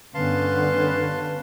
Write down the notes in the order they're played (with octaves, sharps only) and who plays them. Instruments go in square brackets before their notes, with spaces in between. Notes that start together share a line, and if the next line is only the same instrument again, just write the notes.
[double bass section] G2 B3 C#4 [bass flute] D3 [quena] B4 [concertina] F5 A5 C6